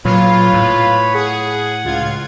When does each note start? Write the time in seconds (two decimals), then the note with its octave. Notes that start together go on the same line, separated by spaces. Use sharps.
0.05 A#2 F#3 F4 B4 C#5 B5
0.54 A2
1.14 G#4 F#5
1.84 C#2 F4 G#6